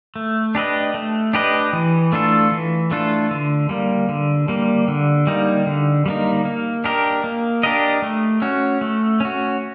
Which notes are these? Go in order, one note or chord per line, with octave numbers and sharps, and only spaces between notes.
A3
D4 G4 B4 D#5
A3
D4 G4 B4 D#5
E3
A3 D4 F4 A4
E3
A3 D4 F4 A4
D3
G3 A#3
D3
G3 A#3
D3
G3 A#3 D#4
D3
G3 A#3 D#4
A#3
D4 G4 A#4 D#5
A#3
D4 G4 A#4 D#5
A3
C#4 F#4
A3
C#4 F#4